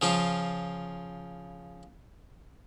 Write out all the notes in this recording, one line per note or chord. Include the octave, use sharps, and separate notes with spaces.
C#3 F3 F4